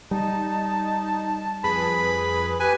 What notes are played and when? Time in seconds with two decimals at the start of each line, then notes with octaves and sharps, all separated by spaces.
0.11 G3 D#4 A5
1.64 F2 G#4 B4 B5
2.60 G4 B4 G#5